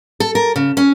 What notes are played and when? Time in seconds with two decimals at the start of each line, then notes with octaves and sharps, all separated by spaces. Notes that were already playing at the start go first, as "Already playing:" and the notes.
0.20 A4
0.35 A#4
0.56 C#3
0.77 C#4